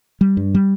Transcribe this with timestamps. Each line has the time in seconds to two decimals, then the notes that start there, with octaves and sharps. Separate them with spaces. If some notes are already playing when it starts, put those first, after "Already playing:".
0.21 G3
0.37 G2
0.55 G3